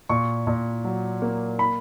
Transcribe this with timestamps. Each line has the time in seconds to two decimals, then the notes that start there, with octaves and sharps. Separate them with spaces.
0.09 A#2 C#6
0.47 A#2
0.84 F#3
1.22 A#3
1.59 B5